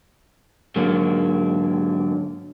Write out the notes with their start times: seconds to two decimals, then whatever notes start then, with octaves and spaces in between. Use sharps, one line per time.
0.76 G#2 D3 F#3 A#3